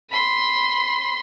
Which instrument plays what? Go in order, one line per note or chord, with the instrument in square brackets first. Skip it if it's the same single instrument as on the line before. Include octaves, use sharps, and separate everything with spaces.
[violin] B5 C6